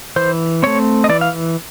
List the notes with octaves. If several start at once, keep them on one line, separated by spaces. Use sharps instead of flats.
E3 C5
A3 C4 C#5
D#5
E3 D5
F5